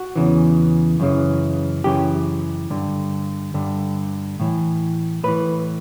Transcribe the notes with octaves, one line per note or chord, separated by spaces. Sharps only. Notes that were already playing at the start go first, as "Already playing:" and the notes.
Already playing: F#4
E2 C#3 E3
F#2 C#3 E3
F#2 C#3 E3 G4
G2 D3
G2 D3
A2 E3
A2 E3 B4